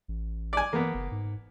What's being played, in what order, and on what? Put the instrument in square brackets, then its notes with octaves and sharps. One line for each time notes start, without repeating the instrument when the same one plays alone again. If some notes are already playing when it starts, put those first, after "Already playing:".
[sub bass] A1
[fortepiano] D5 G#5
[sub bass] E3 [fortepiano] A#3 B3
[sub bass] F#1
G#2